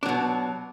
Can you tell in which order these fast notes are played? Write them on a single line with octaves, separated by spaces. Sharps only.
D4 F#3 B2